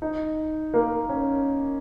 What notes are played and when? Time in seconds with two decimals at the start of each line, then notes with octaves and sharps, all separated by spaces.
0.02 D#4
0.74 A#3
1.09 C#4